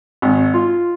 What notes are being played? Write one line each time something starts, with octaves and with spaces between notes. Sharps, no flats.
G#1
F4